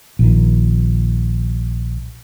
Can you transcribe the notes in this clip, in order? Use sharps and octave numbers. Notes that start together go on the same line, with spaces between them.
A#1 D#3